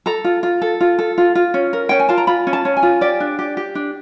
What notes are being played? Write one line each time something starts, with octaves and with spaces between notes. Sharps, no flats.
A4 A#5
F4
F4
A4
F4
A4
F4
F4
C#4
A#4
C#4 G5
G#5
F4 A5
A#5
F4 B5
C#4
A5
C#4
G#5
F4
G4 D5
D4
G4
G4
D4